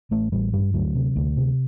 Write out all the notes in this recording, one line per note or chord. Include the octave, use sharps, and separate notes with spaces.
A1 A3
A1 G3
G2 G3
D2 F#3
C3
D2
C3